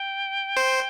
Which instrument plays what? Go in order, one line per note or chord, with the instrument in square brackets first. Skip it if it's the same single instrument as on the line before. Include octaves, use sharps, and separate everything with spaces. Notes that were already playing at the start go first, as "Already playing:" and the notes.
Already playing: [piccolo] G5
[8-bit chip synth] C5